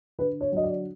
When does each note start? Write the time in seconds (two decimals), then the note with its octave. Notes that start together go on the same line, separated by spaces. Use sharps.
0.18 D3 B4
0.41 C#5
0.52 F#3 D#5
0.63 D5